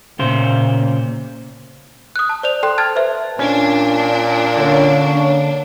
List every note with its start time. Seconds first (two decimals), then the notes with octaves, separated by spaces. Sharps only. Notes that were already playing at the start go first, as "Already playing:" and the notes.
0.19 A#2 C#3 C5
2.16 D#6 F#6
2.29 A5
2.43 C5 D5 F7
2.63 A4 G5 C6 F#6
2.78 A5 F6 G#6 A6
2.95 B4 C5 E5
3.39 A#2 C#4 D4
4.57 D3 A#3 C#4 C#5